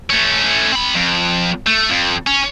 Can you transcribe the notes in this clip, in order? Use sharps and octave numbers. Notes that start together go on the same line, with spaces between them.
A3 C#4
C4 B5
F2
A3
F2
C#4